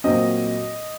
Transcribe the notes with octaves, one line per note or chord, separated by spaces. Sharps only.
A#2 F#3 C4 D#5